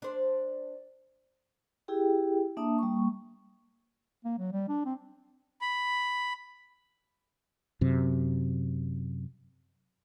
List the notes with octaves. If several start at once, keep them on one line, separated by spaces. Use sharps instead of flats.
D4 C5
E4 G4 G#4 G5
A#3 D4 E5 A5 D#6
G3 A#3 C#6
A#3
F#3
G3
D4
C4
B5
F#2 C3